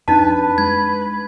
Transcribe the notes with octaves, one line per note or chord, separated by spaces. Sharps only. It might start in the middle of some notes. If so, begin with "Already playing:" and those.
F2 C4 D4 D#4 B4 A5
G#3 G#6